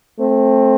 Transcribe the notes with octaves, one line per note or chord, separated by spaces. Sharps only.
A3 C4